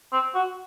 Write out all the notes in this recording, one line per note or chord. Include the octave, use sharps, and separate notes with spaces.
C4
F#4